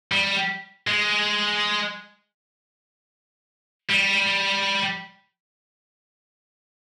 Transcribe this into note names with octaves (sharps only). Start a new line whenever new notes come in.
G3
G#3
G3